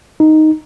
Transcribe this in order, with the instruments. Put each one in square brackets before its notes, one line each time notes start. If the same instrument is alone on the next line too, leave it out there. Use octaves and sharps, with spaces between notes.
[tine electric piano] D#4